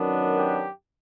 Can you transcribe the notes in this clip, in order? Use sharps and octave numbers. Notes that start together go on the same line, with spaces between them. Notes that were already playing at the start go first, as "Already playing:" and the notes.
Already playing: F#2 D#3 F#3 B3 D4
G4